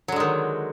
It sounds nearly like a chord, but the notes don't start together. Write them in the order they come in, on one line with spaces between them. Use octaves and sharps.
F#3 D3 G#3 D#3